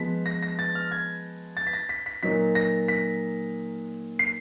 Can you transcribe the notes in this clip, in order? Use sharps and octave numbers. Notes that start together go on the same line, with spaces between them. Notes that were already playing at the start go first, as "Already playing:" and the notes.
Already playing: F3 G#3 B3 B6
A#6
A#6
A6
F6
G#6
A6
B6
A#6
B6
B6
A#2 F#3 A#3 D#4 B6
A#6
B6
C7